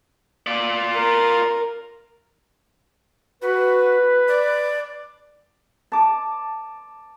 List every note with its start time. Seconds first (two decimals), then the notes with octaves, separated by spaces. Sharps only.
0.47 F4 D5
0.95 A#4
3.42 F#4 B4
4.28 D5
5.92 A5 D6